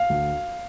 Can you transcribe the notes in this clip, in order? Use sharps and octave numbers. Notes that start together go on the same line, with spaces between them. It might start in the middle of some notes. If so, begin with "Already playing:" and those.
Already playing: F5
D2